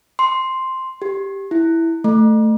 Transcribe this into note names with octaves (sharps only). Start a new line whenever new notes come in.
C6
G4
E4
A3